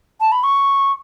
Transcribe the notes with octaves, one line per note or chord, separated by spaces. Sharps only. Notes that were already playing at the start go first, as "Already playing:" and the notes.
A5
B5
C#6